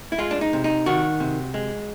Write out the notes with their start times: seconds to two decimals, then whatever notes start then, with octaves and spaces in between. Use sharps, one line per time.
0.12 E4
0.18 G#3 F4
0.31 D4
0.41 D#4
0.53 C3
0.64 D#4
0.86 D#3 F#4
1.20 C3
1.54 G#3